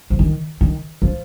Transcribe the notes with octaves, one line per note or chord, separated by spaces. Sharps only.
F3
D#3
D#3
F3